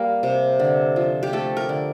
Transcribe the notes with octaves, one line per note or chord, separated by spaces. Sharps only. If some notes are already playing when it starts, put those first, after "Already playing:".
Already playing: G3 A#3 A#4
C3
D3
F3
G4
A3 A4
A#4
D3